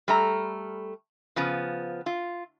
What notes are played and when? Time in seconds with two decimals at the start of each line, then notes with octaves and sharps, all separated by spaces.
0.08 G3 A3 A#5
1.36 C#3 F3 B3
2.06 F4